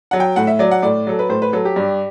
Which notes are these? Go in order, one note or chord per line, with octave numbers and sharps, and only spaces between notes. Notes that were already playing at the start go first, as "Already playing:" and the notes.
F#3 F#5
G5
A2 F#5
E5
F#3 D5
F#5
A2 D5
F#3 A4
B4
A2 C5
B4
F#3 A4
G4
G2